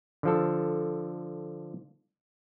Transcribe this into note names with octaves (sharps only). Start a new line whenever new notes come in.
D3 F3 A4